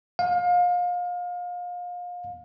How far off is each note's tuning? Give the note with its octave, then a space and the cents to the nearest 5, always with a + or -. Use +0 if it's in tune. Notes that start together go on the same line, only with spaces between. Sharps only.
F5 +30